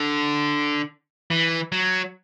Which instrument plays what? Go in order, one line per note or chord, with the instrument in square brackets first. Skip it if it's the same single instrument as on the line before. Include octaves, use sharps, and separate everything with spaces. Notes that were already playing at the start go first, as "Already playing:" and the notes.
Already playing: [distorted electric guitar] D3
E3
F#3